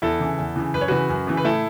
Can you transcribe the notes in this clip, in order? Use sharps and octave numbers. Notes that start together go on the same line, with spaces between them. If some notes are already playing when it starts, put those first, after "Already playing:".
E2 E4 A4
C#3 E3
E2
C#3 E3
F#2 B4
C#5
C#3 E3 F#4 B4
F#2
C#3 E3
B4
A2 E4 A4